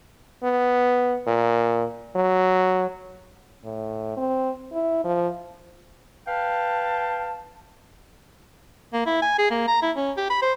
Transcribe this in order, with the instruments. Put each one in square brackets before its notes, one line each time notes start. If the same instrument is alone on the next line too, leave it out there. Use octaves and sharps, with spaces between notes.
[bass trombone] B3
A#2
F#3
[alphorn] A2
C4
E4
F3
[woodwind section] B4 F5 G5 A5
[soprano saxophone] A#3
E4
G#5
G#4
A#3
A#5
E4
C#4
G4
B5
C5